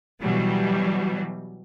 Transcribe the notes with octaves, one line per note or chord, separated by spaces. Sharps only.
B2 E3 F#3 G3